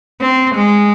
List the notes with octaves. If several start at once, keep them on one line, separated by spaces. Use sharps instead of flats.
C4
G#3